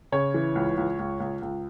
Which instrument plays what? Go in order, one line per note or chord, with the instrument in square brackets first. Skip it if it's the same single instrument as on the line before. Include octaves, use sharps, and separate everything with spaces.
[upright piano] C#3 C#5
E3
C#2
C#2
C#2
C#2
C#2